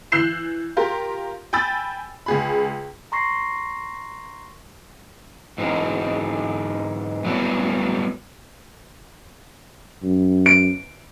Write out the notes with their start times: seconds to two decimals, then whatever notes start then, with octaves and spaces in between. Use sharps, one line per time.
0.12 E3 E6 F#6 G6 C7 E7
0.77 F4 G4 A#4 C6
1.53 G5 G#5 B5 E6 A6
2.26 C#2 G#4 B5
3.12 A#5 C6 C#6 A#6 C7
5.58 G#2 E3 G#3
7.25 F#3 G3 A3 B3 E4
10.03 F#2
10.46 D7